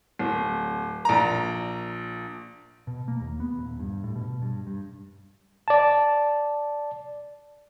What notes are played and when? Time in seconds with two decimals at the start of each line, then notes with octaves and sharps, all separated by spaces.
0.19 D1
1.05 A#1 A#5
2.87 B2
3.08 A#3
3.20 D#2
3.40 B3
3.59 D#1
3.80 G2
4.04 A2
4.15 B2
4.42 G2
4.67 G2
5.68 D5 A5